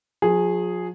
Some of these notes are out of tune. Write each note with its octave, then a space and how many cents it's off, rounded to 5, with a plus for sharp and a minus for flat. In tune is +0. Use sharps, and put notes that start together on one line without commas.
F3 +45 G#4 +0